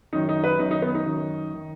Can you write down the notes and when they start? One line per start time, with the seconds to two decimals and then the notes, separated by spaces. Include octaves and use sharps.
0.13 F#2 D#3 D#4
0.29 D#4
0.44 B4
0.59 F#2 D#3 D#4
0.71 D#4
0.82 B3
0.95 D#4
1.06 F#2 D#3
1.54 D#3